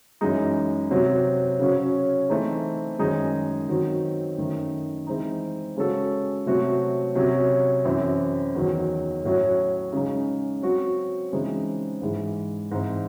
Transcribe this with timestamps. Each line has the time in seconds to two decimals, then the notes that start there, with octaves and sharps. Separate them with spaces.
0.21 F#2 E3 G#3 D#4
0.91 C3 F#3 C4
1.59 C#3 F#3 C#4
2.30 E3 A3 C4 D#4 G#4
2.99 F#2 D#3 G#3 D#4 G#4
3.68 D#3 F#3 C4 F#4
4.38 F#2 D#3 A3
5.07 E3 G#3 C4 D#4
5.77 C#3 G#3 C#4 F#4 A4
6.46 C3 F#3 A3 C4 F#4
7.15 C3 F#3 C#4
7.85 F#2 E3 C4
8.55 E2 D#3 F#3
9.24 A2 F#3 C#4
9.93 C#3 G#3 D#4
10.62 F#3 C4 F#4
11.32 C#3 E3 G#3 C4 D#4
12.01 G#2 E3 G#3
12.71 G#2 E3 C4